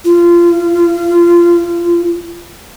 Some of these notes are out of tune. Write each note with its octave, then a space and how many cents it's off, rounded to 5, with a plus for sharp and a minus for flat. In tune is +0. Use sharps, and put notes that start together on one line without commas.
F4 -25